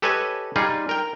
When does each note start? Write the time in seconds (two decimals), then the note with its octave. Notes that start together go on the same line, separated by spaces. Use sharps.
0.02 G4 A4 B4 C#5 D#5 G#5
0.56 G3 D#4 F4 G#4
0.89 A#4 G5